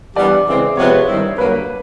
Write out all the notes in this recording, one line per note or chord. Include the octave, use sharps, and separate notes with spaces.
E3 G3 B3 D4 G4 D5
C#3 E3 G#3 C4
C3 F3 G#3 B3 C#5
G2 D#3 G3 C4 E4
G2 D3 F#3 A#3 B4